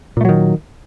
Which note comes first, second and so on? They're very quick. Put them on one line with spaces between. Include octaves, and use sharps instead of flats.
A#2 A3 F#3 D#3